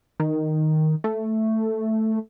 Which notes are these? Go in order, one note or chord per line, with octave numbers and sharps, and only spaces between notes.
D#3
A3